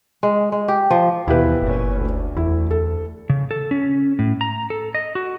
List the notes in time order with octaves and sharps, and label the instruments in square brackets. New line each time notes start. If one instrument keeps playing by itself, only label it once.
[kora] G#3
G#3
G4
F3
[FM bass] D#2 [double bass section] B2 E3 [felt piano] E4 G4 B4
[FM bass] F#1 [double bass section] A#2 C#4
[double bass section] D2
[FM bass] E2 [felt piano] E4
[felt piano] A4
[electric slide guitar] C#3
A4
C#4
A2
A#5
A4
D#5
F#4